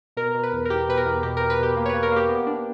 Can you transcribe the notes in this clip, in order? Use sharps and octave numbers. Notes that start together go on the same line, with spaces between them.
B2 A#4
B2
B4
E2
A#4
E2 G4
B2 B4
A#4
E2
B2 G4
B2 A#4
B4
B2 G4
A#3
C#5
A#3 B4
A#4
A#3 G4
B3
D4